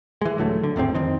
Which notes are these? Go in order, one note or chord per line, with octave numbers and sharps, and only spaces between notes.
E3 G#3
D#1 D3 F#3 A3
D3
G#1 E2 A2 C4
F2 D#3 C4